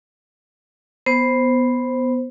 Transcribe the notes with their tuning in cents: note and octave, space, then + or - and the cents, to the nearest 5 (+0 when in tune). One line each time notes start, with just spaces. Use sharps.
B3 +0 C5 +0